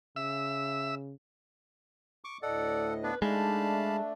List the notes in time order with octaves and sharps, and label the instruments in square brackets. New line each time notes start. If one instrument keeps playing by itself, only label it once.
[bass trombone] C#3 [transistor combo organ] E5 E6
[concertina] C#6 D6
[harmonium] D2 A2 D#5 [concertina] A4 F#5 [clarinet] D5
[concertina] B3 D4 [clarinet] B4
[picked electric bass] G#3 [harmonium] A3 D4 [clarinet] D#4 [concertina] F5 A5 B5